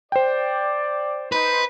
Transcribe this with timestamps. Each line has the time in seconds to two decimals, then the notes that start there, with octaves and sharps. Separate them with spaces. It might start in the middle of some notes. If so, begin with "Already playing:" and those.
0.12 C5 D5 G5
1.32 D#4 B4 C5